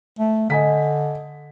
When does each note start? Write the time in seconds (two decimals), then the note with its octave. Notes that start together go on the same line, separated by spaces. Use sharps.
0.19 A3
0.50 D3 D#5 G#5 B6